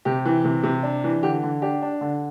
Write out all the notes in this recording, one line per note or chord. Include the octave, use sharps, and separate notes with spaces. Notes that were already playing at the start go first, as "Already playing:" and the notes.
C3 G4
E3
C3
C3
D4
E3
D3 G4
D3
D4 G4
D4
D3